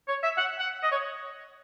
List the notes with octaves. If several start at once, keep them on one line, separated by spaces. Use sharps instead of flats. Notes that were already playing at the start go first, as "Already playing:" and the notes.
C#5
E5
F#5
F#5
D#5
C#5